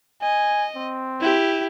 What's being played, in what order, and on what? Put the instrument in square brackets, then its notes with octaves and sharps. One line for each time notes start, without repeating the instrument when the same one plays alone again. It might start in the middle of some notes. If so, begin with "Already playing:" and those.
[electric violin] D#5 [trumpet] G#5
[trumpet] C4
[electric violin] E4 G4